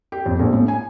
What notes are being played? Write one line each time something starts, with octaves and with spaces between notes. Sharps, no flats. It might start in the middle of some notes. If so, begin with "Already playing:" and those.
G4
F2
A#1
A2
G#5